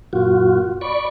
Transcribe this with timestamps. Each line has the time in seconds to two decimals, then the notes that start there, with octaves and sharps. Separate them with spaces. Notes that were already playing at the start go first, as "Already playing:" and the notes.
0.13 F#2 A#2 F4 F#4
0.81 D5 B5 C#6